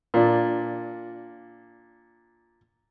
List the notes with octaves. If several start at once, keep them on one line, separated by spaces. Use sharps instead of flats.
A#2 D4